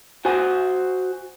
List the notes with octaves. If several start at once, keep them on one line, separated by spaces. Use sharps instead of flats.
F#4 C5 G#5